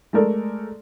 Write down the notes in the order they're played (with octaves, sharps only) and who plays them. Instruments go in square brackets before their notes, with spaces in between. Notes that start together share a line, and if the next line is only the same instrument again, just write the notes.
[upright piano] G#3 A3 A4 A#4 D5